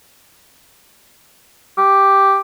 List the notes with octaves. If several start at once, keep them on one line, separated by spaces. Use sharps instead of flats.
G4